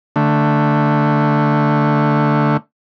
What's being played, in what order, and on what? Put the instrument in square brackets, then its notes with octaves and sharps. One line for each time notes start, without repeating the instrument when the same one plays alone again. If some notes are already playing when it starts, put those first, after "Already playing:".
[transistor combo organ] D3 A3